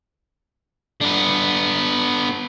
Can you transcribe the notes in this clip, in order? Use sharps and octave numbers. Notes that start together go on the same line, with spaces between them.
D3 B3